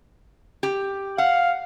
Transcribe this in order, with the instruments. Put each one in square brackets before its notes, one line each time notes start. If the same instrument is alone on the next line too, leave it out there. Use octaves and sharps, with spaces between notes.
[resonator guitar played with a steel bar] G4
[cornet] F5 [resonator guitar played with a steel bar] F#5